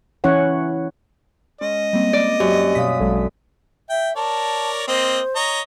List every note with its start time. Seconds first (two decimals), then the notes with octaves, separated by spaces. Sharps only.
0.24 E3 C#4 E4 C#5 F#5
1.61 G#3 C#4 D#5
1.93 G3 A#3 C4
2.13 D5
2.40 F#2 G4
2.75 B2 C#5 F5 D#6 B6
3.00 A#1 F#3 G#3 A4
3.89 E5 G5
4.16 A#4 C#5 D5 A5
4.88 A#3 C4 C5 D#5
5.36 C#5 D#5 A#5